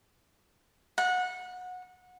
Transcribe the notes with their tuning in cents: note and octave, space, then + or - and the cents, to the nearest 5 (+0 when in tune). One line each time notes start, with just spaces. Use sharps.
F#5 -20